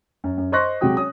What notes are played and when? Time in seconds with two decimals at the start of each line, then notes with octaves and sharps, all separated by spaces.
0.24 F#2
0.38 F#2
0.52 C5 D#5 C6 C#6 F#6 A#6
0.81 C3 F#3 G#3 F#4 G5 D#6
0.97 C#4 D#6